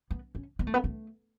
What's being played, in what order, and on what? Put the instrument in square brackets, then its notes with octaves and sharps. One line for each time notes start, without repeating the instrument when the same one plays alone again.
[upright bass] B3
C#4
B3
A3
B3
A3